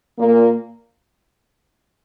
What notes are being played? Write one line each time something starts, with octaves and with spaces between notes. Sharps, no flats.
A#2 A#3